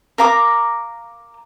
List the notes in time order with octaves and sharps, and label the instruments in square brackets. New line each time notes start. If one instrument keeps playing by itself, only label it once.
[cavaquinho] A#4 F5 A#5 D6